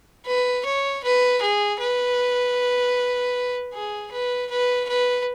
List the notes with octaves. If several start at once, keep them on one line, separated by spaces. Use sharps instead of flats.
B4
C#5
B4
G#4
B4
G#4
B4
B4
B4